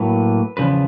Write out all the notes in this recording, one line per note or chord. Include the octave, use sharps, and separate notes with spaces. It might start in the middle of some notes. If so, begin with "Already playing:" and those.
Already playing: A2 F#3 A#3 B4
E2 C#3 F3 B4